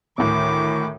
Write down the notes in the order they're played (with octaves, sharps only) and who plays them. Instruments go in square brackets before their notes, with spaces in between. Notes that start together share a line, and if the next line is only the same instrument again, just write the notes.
[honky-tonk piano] D2 A2 [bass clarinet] D#3 [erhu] D6